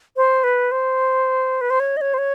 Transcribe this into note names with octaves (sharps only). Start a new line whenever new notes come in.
C5
B4
C5
B4
C5
C#5
D#5
C#5
C5
C#5